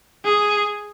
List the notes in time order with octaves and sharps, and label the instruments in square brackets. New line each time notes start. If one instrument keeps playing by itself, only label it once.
[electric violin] G#4